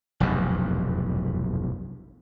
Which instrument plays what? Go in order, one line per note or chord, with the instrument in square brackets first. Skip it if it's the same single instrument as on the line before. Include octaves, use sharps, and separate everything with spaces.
[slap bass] F1 B1 E2 G2